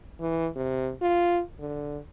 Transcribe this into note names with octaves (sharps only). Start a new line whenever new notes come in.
E3
C3
F4
D3